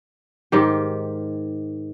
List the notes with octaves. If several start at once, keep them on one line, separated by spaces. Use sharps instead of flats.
G#2 D#3 G4